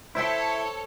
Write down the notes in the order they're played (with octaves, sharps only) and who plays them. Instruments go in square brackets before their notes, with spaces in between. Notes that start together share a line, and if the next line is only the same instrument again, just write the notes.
[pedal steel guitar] E4 [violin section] A4 C#5 [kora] C5 E5 G5